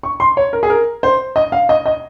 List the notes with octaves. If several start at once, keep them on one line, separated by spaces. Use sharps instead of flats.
C#6
C6
C#5
A#4
G#4
A#4
C5
D#5
F5
D#5
D#5